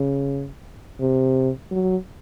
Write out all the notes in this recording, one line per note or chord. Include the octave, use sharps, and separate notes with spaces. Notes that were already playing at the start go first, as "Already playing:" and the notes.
Already playing: C#3
C3
F#3